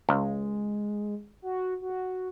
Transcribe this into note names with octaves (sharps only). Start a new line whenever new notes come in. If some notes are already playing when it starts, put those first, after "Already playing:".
C#2 G#3
F#4
F#4